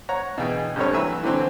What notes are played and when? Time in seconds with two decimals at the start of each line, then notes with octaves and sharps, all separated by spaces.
0.09 C#5 F#5 A#5
0.38 B2 E3 E4 G#4 G5
0.76 A1 G2 C4 A4 C#5
0.93 E3 F#3 B4 E5 E6
1.24 D3 E3 F#3 C4